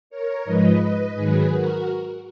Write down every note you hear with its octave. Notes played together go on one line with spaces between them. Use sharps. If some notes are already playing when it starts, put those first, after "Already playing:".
A#4 C#5
G#2 F3 G#3 B4 D#5
G#2 D#3 F#3 G#4 B4
F#4 A#4